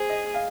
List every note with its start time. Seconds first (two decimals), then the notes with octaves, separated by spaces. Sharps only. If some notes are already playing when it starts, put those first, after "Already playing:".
Already playing: G#4 C5
0.10 D#5
0.34 F5